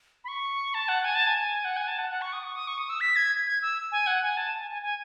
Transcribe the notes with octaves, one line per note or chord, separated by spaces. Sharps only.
B5
C#6
A5
F#5
G#5
A5
G#5
F#5
G#5
A5
F#5
F#5
C#6
D#6
C#6
D#6
C#6
D#6
E6
B6
G#6
G#6
E6
G#5
F#5
G#5
A5
G#5
G#5
G#5